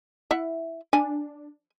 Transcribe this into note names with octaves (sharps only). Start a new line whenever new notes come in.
E4 E5 F#5
D4 G#5